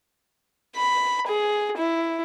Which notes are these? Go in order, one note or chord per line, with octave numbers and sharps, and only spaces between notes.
B5
G#4
E4